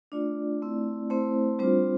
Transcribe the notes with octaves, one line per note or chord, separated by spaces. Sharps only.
A3 D4 F4 D5
A3 C4 E4
A3 C4 E4 C5
G3 C4 D4 F4 C5